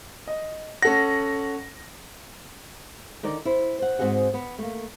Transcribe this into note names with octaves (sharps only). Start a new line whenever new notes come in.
D#5
C#4 A4 F#5 A#6
D3 D#3 D#4 A#4 D5
E4 C5
C5 F#5
G#2 C4 F#4 G#4 F#5
B3
A3 A#3